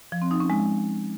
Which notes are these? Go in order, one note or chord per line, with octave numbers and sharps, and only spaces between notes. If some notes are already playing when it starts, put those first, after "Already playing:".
F3
C4
D#4
C#4
G#3